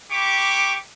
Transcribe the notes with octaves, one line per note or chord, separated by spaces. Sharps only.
E4 G4 C#6 D6